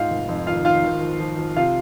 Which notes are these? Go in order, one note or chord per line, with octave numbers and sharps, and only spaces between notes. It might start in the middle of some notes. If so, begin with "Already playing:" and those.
Already playing: G#2 F4 F5
F1
F2
D#3 F4 F5
D#3 F4 F5
G#1
F3
F3
F3
C3 F4 F5